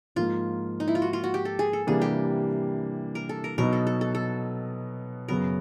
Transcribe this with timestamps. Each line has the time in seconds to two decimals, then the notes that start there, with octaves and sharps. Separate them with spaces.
0.16 G#2 F3 A#3 F4
0.80 D#4
0.88 E4
0.95 F4
1.02 F#4
1.13 F4
1.24 F#4
1.34 G4
1.45 A4
1.59 G#4
1.73 A4
1.87 C3 E3 G3 A#3 D4 G#4
2.02 G4
3.15 A#4
3.29 A4
3.44 A#4
3.58 B2 F#3 B3 D#4 A#4
3.73 A4
3.87 A4
4.01 A4
4.15 A4
5.28 F#2 C#3 F#3 B3 A#4